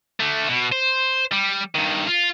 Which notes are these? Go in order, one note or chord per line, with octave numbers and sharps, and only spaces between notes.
D3 A3
B2
C5
G3
G2 D#3
F4